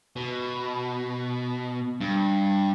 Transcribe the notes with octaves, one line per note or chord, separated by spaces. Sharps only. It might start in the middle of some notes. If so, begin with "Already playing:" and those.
B2
G2